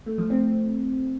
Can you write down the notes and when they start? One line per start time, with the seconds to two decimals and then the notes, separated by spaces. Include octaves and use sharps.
0.06 A3
0.18 F3
0.30 C4